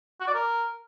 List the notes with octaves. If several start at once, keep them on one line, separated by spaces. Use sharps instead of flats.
F#4
D5
A#4